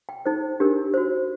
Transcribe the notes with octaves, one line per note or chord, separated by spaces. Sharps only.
G5
D#4 A4 C5
D4 G4 A#4
F#4 C5